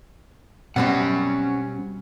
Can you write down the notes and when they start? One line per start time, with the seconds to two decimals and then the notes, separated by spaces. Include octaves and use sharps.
0.76 B2 G3 C4 C#4 F#5